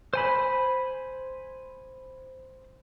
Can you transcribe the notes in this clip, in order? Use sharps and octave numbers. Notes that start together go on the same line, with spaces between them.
C5 G#5 B5